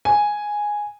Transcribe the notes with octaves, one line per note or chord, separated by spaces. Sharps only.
G#5